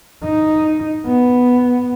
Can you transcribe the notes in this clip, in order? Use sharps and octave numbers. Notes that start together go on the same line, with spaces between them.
D#4
B3